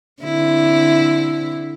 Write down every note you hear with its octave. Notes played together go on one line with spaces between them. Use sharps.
D3 C4 E4